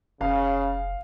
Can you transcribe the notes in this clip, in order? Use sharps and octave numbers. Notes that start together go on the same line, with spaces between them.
F1 C#3 F5